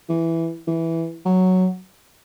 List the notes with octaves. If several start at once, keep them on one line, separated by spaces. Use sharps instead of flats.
E3
E3
F#3